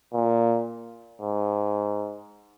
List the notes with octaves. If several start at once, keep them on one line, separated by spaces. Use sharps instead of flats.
A#2
G#2